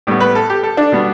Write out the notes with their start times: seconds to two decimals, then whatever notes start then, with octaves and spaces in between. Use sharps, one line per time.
0.07 A2 G3 B3
0.20 B4
0.35 A4
0.50 G4
0.63 A4
0.77 D4
0.92 B2 G3 B3